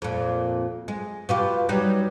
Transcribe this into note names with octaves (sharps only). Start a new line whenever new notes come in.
F2 A#2
G#3
B2 F4 G4
F#3 G3 D#4